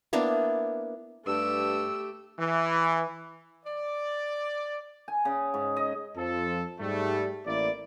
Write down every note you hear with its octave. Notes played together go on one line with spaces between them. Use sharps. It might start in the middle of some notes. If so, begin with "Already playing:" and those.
A#3 B3 D4 E4
G2 A3 G4 E6
E3
D5
G#5
C#3
G#2
D#5
F2 F3 A4
G#2 G3 A3
A1 A#3 E4 D5